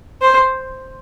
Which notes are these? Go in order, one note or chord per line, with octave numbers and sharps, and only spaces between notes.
C5